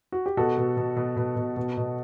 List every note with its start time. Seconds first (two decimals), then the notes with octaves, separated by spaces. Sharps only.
0.12 F#4
0.26 G4
0.37 B2 F#4 A4
0.57 B2
0.77 B2
0.96 B2
1.16 B2
1.36 B2
1.56 B2
1.77 B2